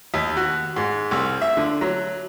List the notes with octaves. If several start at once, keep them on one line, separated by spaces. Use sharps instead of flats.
D#2
F#4
G#2
C2
E5
D3
F#3